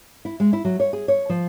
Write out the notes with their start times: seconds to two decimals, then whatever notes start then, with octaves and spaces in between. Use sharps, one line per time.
0.25 E4
0.40 G#3
0.53 E4
0.65 F#3
0.80 C#5
0.93 G#4
1.08 C#5
1.29 F3